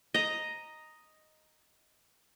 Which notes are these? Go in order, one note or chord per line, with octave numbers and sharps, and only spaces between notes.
D#5 A#5